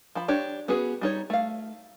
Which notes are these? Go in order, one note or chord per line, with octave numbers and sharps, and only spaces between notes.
F3 B5
D4 G4 C#5
B3 C#4 F#4 G#4 B4
G3 D#4 C#5
A3 F5